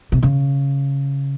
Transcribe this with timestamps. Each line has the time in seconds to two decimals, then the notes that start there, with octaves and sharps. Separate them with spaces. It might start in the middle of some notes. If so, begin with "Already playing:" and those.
0.12 C3
0.23 C#3